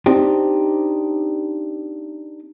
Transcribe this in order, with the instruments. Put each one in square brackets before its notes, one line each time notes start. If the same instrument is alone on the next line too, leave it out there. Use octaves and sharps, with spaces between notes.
[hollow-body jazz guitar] C4 D4 D#4 G4